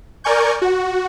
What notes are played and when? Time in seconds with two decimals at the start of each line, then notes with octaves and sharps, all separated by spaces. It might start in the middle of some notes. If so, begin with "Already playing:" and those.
0.24 A#4 D5 G#5 C#6 G6
0.62 F#4